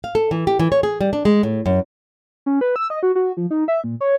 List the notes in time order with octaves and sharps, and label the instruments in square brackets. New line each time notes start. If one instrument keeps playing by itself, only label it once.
[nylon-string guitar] F5
A4
E3
G4
E3
C#5
G#4
G3
D4
G#3
A2
F#2
[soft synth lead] C#4
B4
E6
D#5
F#4
F#4
F3
D#4
E5
A#2
C#5